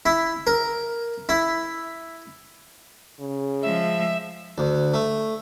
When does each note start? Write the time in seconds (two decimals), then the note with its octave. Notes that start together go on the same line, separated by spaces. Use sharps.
0.06 E4
0.47 A#4
1.29 E4
3.20 C#3
3.63 F3 G#3 E5
4.58 D2
4.94 A3